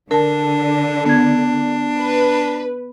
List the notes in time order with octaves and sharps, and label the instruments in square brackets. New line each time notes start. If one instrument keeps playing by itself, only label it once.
[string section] D3 [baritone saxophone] D4 [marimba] A#4 A5
[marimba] B3 G#6 [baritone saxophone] D4
[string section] B4